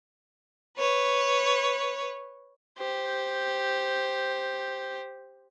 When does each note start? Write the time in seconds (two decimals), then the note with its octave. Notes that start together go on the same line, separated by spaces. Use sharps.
0.77 B4 C#5
2.78 G4 C5